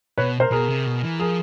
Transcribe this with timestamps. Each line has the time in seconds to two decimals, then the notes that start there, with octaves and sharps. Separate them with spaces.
0.18 B2 B4 C#5
0.40 A#4 C5
0.52 B2 G#4 A#4
0.68 C3
0.86 B2
1.03 E3
1.20 F3 G#4 A#4